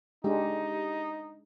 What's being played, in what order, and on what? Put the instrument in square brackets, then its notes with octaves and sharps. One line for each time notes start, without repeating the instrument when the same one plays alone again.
[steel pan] G#3 D4 [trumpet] D#4 [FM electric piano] G4